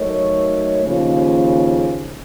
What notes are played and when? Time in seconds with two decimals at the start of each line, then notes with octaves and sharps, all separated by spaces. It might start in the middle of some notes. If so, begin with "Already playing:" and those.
Already playing: F#3 A3 D#4 A#4 C#5
0.84 D#2 C#3 F3